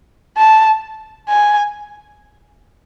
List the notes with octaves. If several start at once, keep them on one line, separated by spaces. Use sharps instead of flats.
A5
G#5